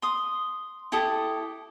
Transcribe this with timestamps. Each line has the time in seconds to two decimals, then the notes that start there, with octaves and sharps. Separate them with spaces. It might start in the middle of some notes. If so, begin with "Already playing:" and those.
0.02 C6 D#6
0.92 E4 G4 A4 D#6